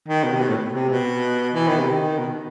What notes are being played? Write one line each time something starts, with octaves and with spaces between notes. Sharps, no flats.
D#3
B2
C3
B2
A2
C3
B2
E3
D#3
C3
D#3
B2